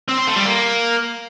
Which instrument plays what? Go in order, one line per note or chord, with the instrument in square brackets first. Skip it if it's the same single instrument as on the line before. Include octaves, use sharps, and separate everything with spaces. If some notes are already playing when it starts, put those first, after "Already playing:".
[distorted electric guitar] C4
C5
A3
G3
A#3